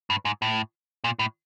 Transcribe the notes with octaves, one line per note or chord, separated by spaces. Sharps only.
G2
G#2
A2
A#2
A2